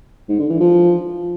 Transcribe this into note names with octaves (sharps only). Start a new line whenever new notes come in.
G#2
D3
E3
F3